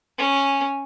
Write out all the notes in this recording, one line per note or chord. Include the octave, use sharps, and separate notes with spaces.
C#4 G#5